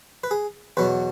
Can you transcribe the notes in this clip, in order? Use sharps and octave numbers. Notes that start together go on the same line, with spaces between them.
B4
G#4
E2 B2 F#3 B4